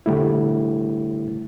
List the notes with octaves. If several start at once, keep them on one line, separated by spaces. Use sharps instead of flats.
D3 G3 A3 E4